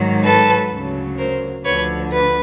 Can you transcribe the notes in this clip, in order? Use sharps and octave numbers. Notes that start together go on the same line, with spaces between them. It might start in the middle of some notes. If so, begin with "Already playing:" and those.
Already playing: G#2 D#3 F#3
A4 B4
D2 C#3 F#3
A#4 C5
D2 D3 F3 B4 C#5
B4